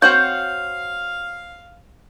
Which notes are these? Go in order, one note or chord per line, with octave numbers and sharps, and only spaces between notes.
C4 F#4 C#5 F5 G6